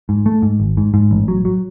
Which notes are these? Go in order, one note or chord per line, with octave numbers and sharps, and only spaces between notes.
G#2
A3
G#2
G#1
G#2
G#2
A1
F#3
F#3